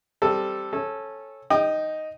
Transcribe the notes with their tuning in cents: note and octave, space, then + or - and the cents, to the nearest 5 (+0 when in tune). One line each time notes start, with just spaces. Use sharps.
G3 +0 C4 +0 A4 +0
C#4 -20 A4 -10
D#4 +0 G5 +0 D#6 -40